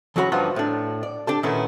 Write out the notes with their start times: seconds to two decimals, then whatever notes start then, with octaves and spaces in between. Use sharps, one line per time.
0.16 E2 F#3 C#4 F#4 C#5 B5
0.32 G2 F3 B3 D#4 F4 F#4
0.56 A2 D4
1.03 D5
1.27 D4 G4 A4
1.43 A#2 D#3 A3 B3 C#4 E4